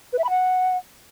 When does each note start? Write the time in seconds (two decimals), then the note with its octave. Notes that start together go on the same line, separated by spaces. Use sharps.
0.13 B4
0.18 E5
0.24 B5
0.30 F#5